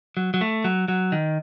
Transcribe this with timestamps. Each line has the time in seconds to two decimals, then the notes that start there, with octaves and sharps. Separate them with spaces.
0.17 F#3
0.34 F#3
0.41 A3
0.64 F#3
0.88 F#3
1.12 D#3